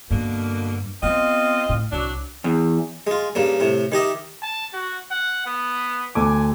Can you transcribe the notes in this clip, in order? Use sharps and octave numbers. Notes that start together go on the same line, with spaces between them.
G2 B2 D3 A#3
B3 C4 F4 D#5
A2
C2 F#3 D4
E2
G#3 F4
G2 C#3 A#3
A2 C3
D#3 G4 D#5 E5
A5
F#4
F#5
B3
D2 A4 G#5 D6